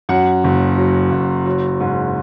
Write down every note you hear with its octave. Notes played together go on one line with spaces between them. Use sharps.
F#2 F#5
F#1
F#3
F#1
F#3
G#2